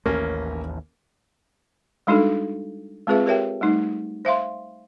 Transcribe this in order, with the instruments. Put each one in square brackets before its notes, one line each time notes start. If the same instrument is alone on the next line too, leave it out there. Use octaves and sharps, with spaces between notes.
[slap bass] A1 D#2 A3 [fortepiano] A#3 C#4
[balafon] G3 G#3 D4 D#4 F#4 A4
G#3 C4 F4 G#4 B4 E5
G4 A#4 C#5 E5 G5
G3 A3 D#4
C5 E5 F5 C6